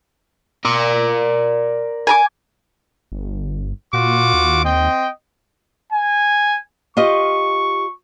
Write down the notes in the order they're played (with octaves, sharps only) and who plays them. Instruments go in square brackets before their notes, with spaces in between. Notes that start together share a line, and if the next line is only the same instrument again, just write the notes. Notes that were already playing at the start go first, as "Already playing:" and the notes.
[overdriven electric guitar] A#4 D5
[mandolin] G#5 A#5 D6
[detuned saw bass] G1
[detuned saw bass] A#2 [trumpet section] F4 F#4 D6
[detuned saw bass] D#2
[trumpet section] C4 D#5 G5
[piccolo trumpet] G#5
[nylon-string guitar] F4 G4 D#5 [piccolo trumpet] C#6